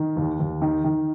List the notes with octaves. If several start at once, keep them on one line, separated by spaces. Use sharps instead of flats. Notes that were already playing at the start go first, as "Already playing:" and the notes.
Already playing: D#3
D#2
D#2
D#3
D#3